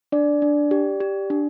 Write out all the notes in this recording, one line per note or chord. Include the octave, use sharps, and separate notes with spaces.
D4 D5
D4
G4
G4
D4